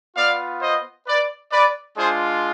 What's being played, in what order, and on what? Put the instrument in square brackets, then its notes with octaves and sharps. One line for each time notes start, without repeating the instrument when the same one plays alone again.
[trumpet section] B3 F4 D5 F5
C5 D#5
B4 D5
B4 D5
G#3 D4 F4 G#4 C5